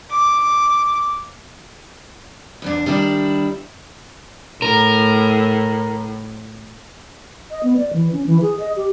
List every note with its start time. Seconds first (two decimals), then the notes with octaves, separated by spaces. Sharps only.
0.11 D6
2.62 E2 G#2 D4
2.86 D#3 G3 D4 E4
4.62 A2 A#4
7.51 D#5
7.63 B3
7.77 D5
7.93 E3
8.13 C#4
8.26 E3
8.42 G#4
8.60 D#5
8.76 G4